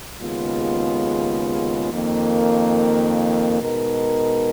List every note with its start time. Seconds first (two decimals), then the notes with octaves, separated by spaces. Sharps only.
0.21 D#2 C#3 G#3 B3 F4
1.92 F2 D#3 A#3
3.61 B2 G#3 D#4 A#4